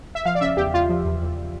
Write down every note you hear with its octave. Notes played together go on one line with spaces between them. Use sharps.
E5
F3 F5
D5
C#3 E5
E2 G4
E2 F4
F3
E2
E2